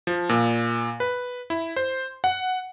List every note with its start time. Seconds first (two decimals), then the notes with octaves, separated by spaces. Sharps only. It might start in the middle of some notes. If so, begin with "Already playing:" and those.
0.07 F3
0.29 A#2
1.00 B4
1.50 E4
1.76 C5
2.24 F#5